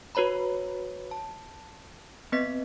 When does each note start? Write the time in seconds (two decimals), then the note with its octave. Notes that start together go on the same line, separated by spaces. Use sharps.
0.15 F#4 B4 C#5 A#5 B5
1.11 A5
2.32 B3 C4 B4 D#5 B6